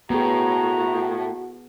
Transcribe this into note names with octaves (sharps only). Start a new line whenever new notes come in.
A2 B3 F#4 G#4 A#5